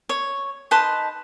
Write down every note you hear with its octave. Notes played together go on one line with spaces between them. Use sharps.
C#5
D#4 B4 A5 C6